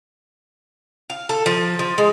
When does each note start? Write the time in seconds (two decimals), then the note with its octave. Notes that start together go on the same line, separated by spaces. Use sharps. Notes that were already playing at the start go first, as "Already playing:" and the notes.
1.10 F5
1.29 A4
1.46 F3
1.79 F3
1.98 G#3